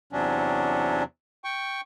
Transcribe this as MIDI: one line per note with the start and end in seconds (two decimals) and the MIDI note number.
0.13 1.03 40
0.13 1.03 48
0.13 1.03 54
0.13 1.03 61
0.13 1.03 62
1.44 1.81 79
1.44 1.81 85